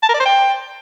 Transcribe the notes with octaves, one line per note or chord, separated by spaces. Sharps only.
A5
A#4
D5
C5
G5